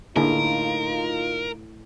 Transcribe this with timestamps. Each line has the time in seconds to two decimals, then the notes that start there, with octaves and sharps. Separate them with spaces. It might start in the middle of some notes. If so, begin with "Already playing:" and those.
0.16 A2 D3 A#3 D#4 F4 G#4 A#4